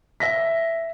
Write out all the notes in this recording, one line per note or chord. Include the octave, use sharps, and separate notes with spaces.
E5 A#6 B6